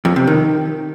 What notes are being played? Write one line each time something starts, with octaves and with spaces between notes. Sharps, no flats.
F2
C3
D#3